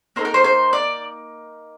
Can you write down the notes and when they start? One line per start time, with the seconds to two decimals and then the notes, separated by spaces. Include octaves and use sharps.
0.16 A#3 D#4 A4 C5
0.25 A#4
0.34 C5
0.44 C5
0.73 D5